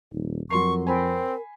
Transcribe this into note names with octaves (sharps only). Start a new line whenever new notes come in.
D#1 D#4
F2 F#3 A#4 C6 C#6 C7
C4 A#4 G#5 B5